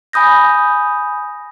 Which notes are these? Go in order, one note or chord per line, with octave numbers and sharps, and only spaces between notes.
G#5 B5 D#6 G6 A#6